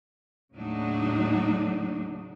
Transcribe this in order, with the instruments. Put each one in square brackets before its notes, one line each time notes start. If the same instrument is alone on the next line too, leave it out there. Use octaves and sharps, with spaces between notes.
[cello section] D#2 A2 C#3 F#3 D4 D#4